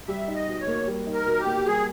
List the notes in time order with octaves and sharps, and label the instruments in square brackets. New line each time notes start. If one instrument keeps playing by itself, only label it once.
[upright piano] G3 [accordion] E5
[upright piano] D#4
[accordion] D#5
[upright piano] B2
[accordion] C#5
[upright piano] A#3
G3
D#4
[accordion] A#4
[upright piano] B2
[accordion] G4
[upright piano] A#3
[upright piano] G3 [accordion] G#4